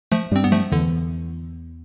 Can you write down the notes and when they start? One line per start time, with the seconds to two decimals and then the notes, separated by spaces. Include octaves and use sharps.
0.12 F3 A3
0.31 G2 G3 C4
0.44 B3
0.52 F3 A3
0.72 E2 D3 E3